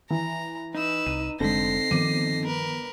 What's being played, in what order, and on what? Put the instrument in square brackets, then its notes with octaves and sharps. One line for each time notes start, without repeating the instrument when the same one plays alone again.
[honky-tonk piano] E3 [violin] A#5
[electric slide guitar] D#4 [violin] B4 E6
[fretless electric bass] C2 [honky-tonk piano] D#7
[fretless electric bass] F1 G#3 [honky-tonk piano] D3 [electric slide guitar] C4 D#4 A4 [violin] A#6 C7
[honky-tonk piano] G1 D6 D#7 [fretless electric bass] D#3 F3
[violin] A#4 B4